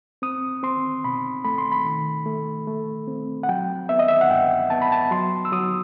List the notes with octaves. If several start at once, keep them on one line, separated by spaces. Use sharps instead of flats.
C4 D#6
C4 C6
B2 B5
A3 B5
C6
B5
D#3
A3
A3
C4
F#5
F#3 G5
B3 E5
D#5
E5
F#5
G2 G5
B3 A5
B5
A5
F#3 C6
E6
F#3 D#6